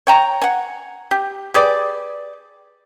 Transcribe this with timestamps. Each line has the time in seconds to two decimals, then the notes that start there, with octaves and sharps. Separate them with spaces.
0.07 C#5 G5 A#5
0.42 F#5 G#5
1.11 G4
1.54 G4 G#4 B4 D5